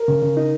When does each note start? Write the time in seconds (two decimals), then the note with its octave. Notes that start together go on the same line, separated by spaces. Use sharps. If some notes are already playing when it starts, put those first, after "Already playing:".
Already playing: A#4
0.08 C#3
0.23 C#3
0.37 D#4